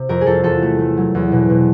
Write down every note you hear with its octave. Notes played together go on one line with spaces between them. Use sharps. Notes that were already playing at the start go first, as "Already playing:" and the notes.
Already playing: C3
F2 A#4
G#4
F2 A4
E2 A4
A3
A3
F#3
E2
B2
B2